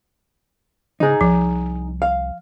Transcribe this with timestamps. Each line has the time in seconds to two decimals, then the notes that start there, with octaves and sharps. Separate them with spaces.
1.00 C#3 D#4 G#4
1.21 C2 F3
2.02 F5